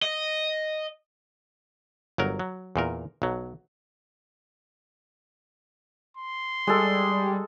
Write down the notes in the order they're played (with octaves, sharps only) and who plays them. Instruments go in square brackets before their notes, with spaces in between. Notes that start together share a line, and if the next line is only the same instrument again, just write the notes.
[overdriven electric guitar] D#5
[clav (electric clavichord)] G1 F#3 A#4
F#3
E2 A#2 A#4
B1 F#3
[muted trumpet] C6
[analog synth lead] G3 [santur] G#3 A4